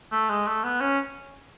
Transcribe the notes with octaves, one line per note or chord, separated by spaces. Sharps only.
A3
G#3
A3
B3
C#4